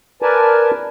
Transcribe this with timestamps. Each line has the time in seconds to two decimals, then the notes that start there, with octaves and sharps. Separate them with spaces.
0.22 A#4 B4 D5 G#5 A5